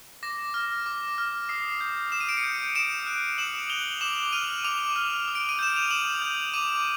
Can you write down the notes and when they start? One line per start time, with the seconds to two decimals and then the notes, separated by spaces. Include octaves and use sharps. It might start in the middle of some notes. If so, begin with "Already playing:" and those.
0.23 D6 A#6
0.54 F6
0.86 D6
1.18 F6
1.49 D#6 C7
1.80 G6
2.12 D#6 E7
2.20 D#7
2.29 D7
2.37 C#7 D#7
2.44 G6
2.75 D#6 D7 E7
3.07 F#6
3.38 D#6 E7 F#7
3.70 F#6 F7 G7
4.01 D6 E7 F#7
4.33 F6 D#7 F7
4.64 D6 D#7 F7
4.96 F6
5.28 D#6
5.35 D7
5.49 D#7
5.59 G6 E7
5.76 F7
5.90 D#6 E7 F#7
6.22 G6
6.53 D6 D#7 F7